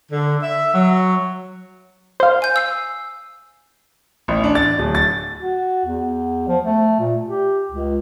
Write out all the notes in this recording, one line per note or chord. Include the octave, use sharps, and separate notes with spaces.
D3
E5
F#3
C5 F5
G#5 G6
E6 C7
A1
D4
A6
D1
A6
F#4
E2
F3
A3
A#2
G4
C#2